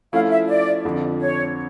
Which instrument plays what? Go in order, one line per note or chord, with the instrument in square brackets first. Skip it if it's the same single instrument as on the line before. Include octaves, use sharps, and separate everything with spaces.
[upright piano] F3 A3 C#4 E4 [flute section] F5
[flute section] E5
D5
[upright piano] F2 D3 F3
[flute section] C#5